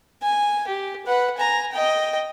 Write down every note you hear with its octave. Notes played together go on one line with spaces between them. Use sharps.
G#5
G4
B4 F#5
G#5 A#5
D#5 G5